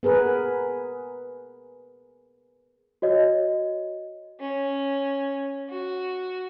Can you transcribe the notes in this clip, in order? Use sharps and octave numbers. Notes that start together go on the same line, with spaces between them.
B3 G#4 A#4 B4
F#4 C#5 D#5
C#4
F#4